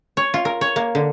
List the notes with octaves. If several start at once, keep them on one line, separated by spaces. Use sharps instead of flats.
C#5
F4
A#4
C#5
A#3
D3